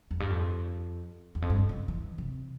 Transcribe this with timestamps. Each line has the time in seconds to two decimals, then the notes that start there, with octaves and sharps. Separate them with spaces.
0.11 F2
0.20 G2
0.30 F2
1.35 E2
1.42 F2
1.50 G2
1.69 C#3
1.88 E3
2.18 C3